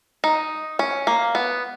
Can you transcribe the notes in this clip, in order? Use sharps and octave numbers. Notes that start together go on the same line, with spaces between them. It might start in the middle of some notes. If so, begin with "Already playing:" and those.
D#4
C#4
A#3
B3